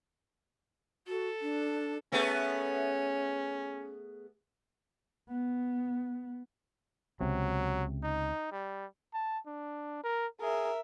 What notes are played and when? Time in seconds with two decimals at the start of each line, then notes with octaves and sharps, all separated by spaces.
1.07 F#4 A4
1.42 D4
2.12 A3 B3 C#4 G#4
5.28 B3
7.21 C#2 C3 F#3
8.03 D#4
8.52 G3
9.14 A5
9.47 D4
10.04 A#4
10.41 G#4 A#4 E5